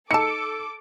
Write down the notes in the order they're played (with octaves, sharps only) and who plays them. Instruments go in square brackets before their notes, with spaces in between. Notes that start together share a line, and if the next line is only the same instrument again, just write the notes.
[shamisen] D#4 A5 [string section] A4 D6 [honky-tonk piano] E6 C#7